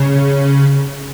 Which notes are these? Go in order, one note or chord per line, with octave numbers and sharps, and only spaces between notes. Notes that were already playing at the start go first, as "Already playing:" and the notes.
Already playing: C#3